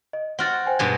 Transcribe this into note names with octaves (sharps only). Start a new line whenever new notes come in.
D#5
C4 F#4 F#5 F6 A6
C5 G5 G#5
G2 B2 G#3 G#6